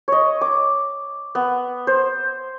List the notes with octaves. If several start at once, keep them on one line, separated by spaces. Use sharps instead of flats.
C#5 D#5
D6
B3
C5